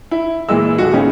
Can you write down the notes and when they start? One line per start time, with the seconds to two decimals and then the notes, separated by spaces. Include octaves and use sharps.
0.11 E4
0.49 A#2 E3 G#3 E6
0.78 D#1 G#3 F#4
0.93 A2 C#3 G#3 B3 C#4 D#4